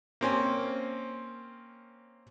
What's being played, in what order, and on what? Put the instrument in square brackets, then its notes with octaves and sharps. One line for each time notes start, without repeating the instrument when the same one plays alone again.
[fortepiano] A#3 C4 C#4